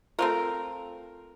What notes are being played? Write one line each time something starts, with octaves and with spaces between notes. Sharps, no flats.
A3 C4 F4 A#4